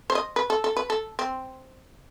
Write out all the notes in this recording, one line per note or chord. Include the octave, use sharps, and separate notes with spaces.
C5
D#5
B4
A4
A4
B4
A4
C4